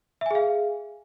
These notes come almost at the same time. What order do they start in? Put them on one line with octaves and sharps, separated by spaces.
E5 G#5 G#4 F5